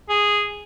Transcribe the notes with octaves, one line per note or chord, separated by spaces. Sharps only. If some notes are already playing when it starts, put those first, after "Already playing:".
G#4